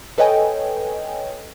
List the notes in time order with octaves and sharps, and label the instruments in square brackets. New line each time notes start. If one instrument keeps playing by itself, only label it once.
[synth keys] A4 B4 C#5 D#5 G5 G#5